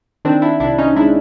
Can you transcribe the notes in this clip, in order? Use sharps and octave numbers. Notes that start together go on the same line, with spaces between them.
D#3 C4 D4
D4 E4
C2 D4 E4
C#4 D#4
G#3 D4 E4